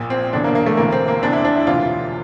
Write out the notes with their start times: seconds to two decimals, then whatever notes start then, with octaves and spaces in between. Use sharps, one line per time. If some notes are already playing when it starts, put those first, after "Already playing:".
Already playing: A#1 A#2
0.10 C4
0.33 E1 E2 D3 D4
0.44 A#3
0.55 A#3
0.66 A3
0.77 E1 D2 C3 E3 A#3
0.92 C4
1.08 A#3
1.22 F1 E2 C3 E3 D4
1.33 E4
1.45 D4
1.55 E4
1.67 E1 D2 C3 E3 F4